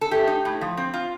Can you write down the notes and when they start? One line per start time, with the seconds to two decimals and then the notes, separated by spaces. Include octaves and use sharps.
0.01 A4
0.11 A3 G4
0.27 D#4
0.45 A2
0.61 F3
0.77 C4
0.94 F4